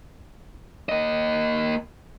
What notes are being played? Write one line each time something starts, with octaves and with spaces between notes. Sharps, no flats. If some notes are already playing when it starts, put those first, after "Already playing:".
A#3 D#5